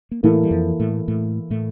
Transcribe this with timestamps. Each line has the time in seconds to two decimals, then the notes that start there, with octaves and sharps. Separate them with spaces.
0.11 A#3
0.23 A2 E3 A3 A#3 E4 A4
0.43 G3
0.51 F2 F3
0.79 A2 A3
1.08 A2 A3
1.50 A2 A3